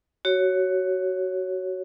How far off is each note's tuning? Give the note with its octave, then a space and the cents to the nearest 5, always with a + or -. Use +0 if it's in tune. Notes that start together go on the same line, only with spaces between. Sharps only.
F#4 +20 C#5 +0